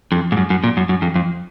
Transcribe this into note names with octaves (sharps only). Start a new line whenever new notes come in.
F2
G#2
F#2
F#2
A#2
F#2
F#2
F2
F2